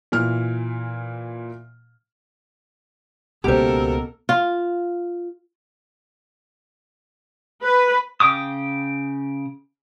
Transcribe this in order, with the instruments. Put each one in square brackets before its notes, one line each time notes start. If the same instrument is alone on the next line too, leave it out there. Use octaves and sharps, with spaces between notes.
[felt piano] A#2 E3 F6
[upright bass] C#2 D#3 [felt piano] B2 A#3 [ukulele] G4 C5 [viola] A4 A#4
[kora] F4
[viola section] B4
[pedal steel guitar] C#3 G5 D6 D#6